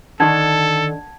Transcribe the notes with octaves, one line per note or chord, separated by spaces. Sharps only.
D3 D#3 D4 A4 F#5 A5 G#6